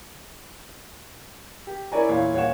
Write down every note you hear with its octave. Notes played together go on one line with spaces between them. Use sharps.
G4
E4 A#4 C#5 D5 G#5 A#5
E2 A#2 E4 C#5 F5
D#1 C#5 F5 F#5 E7